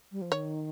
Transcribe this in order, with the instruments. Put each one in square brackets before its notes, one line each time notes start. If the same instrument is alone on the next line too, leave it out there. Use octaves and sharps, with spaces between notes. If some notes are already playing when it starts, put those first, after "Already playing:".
[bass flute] G3
F3
[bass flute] D#3 [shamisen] C#5